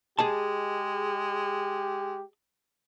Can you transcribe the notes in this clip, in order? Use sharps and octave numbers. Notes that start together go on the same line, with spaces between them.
G#3 G4 G#4 D#5 A5